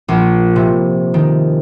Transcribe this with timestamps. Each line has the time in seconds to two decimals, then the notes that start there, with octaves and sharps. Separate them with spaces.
0.08 A#1
0.56 C3
1.14 D#3